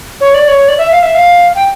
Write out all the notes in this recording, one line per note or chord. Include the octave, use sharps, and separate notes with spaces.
C#5
D5
C#5
D5
E5
F5
E5
F5
G5